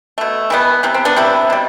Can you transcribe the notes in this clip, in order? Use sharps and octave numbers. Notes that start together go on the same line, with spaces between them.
B2 A3
E3 G3 B3
C3 E3 B3
C4
B3 D4
C3 G3 B3 C4 E4
B2 G3